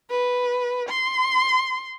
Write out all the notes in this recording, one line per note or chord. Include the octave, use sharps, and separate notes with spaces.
B4
C6